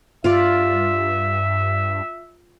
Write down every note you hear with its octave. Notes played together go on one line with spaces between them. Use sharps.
G2 F4 D5 E5